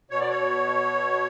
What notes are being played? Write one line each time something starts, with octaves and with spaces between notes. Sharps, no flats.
B2 C#5
D5
C#5